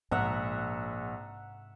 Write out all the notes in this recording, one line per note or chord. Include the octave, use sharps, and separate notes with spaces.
A#1 G#2 C3 E5 F#5 A#5